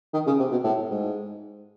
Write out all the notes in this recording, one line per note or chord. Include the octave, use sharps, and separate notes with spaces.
D#3
C#3
C3
B2
A2
G#2